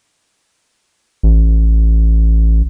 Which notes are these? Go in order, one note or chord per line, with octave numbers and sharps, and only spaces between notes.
A1